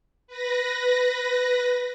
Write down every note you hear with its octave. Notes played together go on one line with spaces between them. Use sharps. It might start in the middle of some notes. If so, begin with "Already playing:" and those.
B4 A#6